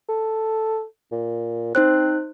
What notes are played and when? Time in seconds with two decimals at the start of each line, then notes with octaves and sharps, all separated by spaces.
0.09 A4
1.11 A#2
1.75 C4 D#4 C5 F#6